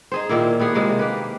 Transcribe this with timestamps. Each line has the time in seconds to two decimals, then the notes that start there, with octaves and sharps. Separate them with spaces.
0.12 D#4 G#4 C5
0.29 A#2 D#3 A#3 E4
0.60 B3 G4 G#4 F#5
0.75 C3 G#3 A#3
0.99 A#3 G4 B4